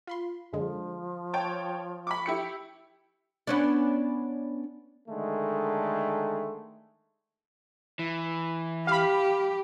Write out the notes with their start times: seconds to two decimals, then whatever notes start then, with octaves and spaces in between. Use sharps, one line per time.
0.07 F4 B5 C6
0.53 F#2 D3 F3 G#3
1.33 C#5 G5 A5
2.07 B5 C#6 D6
2.26 E4 G4 C#7
3.47 B3 C#4 D4
5.09 D3 D#3 G#3 A3
7.99 E3
8.87 G4 F5 B5